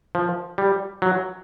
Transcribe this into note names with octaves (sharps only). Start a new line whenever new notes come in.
F3
G3
F#3